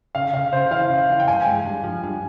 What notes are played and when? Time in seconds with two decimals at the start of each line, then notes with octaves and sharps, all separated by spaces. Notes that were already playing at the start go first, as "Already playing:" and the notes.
0.15 C#3 F5
0.33 C#3 F5
0.53 C#3 C5
0.71 E3 F5
0.90 C#3
1.09 E3 F5
1.20 G5
1.28 G2 G#5
1.46 G#3
1.66 G2
1.84 F3
2.04 G2